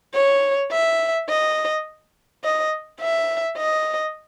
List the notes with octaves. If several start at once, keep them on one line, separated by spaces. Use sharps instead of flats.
C#5
E5
D#5
D#5
E5
D#5